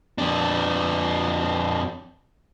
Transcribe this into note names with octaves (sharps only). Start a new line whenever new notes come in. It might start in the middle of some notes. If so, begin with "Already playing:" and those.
F2 D4